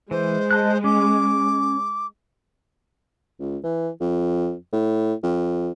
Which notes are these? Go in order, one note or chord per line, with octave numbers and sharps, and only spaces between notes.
E3 G#3 C5
D#5 A5 F#6
C#4 D6
C#2
E3
F2
A2
F2